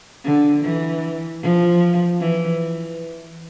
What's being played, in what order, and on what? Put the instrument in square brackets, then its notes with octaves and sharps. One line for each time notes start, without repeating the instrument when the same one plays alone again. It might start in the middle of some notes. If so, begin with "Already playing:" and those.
[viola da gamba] D3
E3
F3
E3